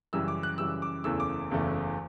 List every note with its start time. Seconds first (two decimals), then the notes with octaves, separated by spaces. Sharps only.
0.13 F#2 C#3 E3 G3 E6
0.28 D6
0.43 F#6
0.58 F#2 C#3 E3 G3 E6
0.82 D6
1.04 F#1 E2 C#3 E3 A3 E6
1.20 D6
1.51 F#1 E2 C#3 E3 A3